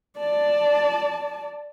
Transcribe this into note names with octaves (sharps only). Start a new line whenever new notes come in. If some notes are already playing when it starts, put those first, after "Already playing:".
D5 A5